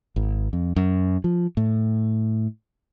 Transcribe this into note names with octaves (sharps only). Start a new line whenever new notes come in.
G#1
F2
F#2
F3
A2